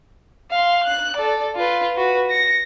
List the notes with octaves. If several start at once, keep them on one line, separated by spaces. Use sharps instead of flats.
F5 C6
F#6
A4 D5
F4 B4
F#4 B4
A#6 C#7